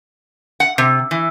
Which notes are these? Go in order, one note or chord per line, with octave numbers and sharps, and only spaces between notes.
F#5
C3
E3